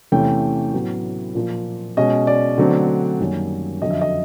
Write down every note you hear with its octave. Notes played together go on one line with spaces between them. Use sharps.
E2 C3 E3 A3 C#4 G5
A2 F#3 B3
A#2 F3 A#3
B2 G#3 C#4 D#5
D5
D3 F#3 A3 C4
F#2 D#3 G3 A#3 C#4
F2 D3 F#3 D#5
E5
D#5